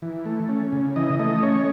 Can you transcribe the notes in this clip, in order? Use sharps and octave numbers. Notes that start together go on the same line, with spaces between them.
E3
A3
C#4
C#3
E3 D#5
A3 D#5
C#4 C#5